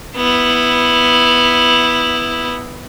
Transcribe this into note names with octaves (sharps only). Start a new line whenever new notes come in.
B3 E4